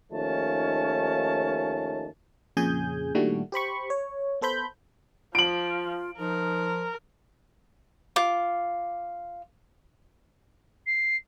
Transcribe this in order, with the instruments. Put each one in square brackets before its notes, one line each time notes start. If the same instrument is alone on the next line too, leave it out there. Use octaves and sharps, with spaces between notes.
[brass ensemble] D#2 F3 A3 C#4 D#4 A5
[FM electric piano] F2 A#2 C#3 G#4 G#5 G6
A#2 D#3 G3 A3 D4 F#4
G4 C5 B5 C#6
C#5
B3 A4 C5 B5 G6
[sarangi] F3 [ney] F4 [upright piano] D7 F#7
[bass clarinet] F3 [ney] D#4 [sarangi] A#4
[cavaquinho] F4 D6
[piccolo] C7